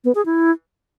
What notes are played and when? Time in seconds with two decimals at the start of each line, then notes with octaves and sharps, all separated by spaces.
0.04 B3
0.15 G#4
0.26 E4